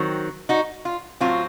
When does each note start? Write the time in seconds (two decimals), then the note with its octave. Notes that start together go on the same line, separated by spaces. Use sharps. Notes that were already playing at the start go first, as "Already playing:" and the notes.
Already playing: D#3 F#3 C4
0.49 D#4 F#4
0.85 F4
1.21 A2 F#3 C4 F4